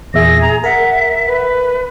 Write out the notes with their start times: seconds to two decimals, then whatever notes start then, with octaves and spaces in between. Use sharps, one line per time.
0.14 E2 A#2 G#4 E5 A#6
0.42 A#5
0.64 A#4 E5 F#5
1.26 B4